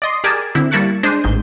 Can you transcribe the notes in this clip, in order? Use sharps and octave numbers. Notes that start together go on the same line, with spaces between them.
D5 D#5 C6
G4 G#4 A#4 D5 G#5 A5
D3 C4 E4
G3 A#3 E4 A5 C#6 F#6
G#3 D4 C5 D#7
A1 G#2 G6